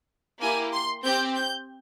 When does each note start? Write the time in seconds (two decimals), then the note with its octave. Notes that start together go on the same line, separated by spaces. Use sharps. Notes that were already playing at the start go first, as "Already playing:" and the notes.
0.41 A#3 E4 G4 G#5
0.73 C6
1.04 C4 G4 G6
1.36 G6